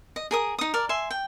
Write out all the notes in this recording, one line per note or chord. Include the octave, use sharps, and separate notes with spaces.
D#5
G#4 A#4 D#6
D#4 D#6
A#4 D5
E5 G#5 C6
G5